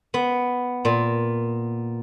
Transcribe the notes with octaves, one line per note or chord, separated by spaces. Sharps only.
B3
A#2